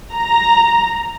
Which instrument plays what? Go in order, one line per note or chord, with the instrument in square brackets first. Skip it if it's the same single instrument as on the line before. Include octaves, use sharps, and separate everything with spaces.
[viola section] A#5